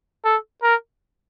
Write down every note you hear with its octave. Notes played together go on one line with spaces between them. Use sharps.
A4
A#4